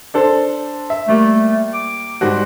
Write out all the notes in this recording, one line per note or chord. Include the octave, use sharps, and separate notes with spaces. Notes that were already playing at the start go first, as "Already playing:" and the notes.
D4 A4 C5
E5
G3 A3 A#3
D6
G#2 G3 F#4